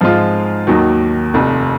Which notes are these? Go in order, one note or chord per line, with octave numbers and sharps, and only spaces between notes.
G#2 F3 G#3 C4 F4
D#2 D#3 F#3
F1 F2 C3